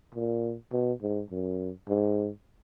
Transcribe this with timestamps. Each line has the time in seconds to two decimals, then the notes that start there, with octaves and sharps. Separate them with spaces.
0.15 A#2
0.72 B2
1.02 G#2
1.31 F#2
1.89 G#2